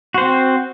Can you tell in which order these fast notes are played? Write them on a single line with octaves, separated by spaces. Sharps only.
F#4 C5 C4